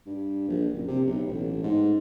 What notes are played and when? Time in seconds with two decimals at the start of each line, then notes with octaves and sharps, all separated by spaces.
0.06 G2
0.48 A#1
0.73 F#1
0.88 C3
1.06 B1
1.27 A1
1.63 G#2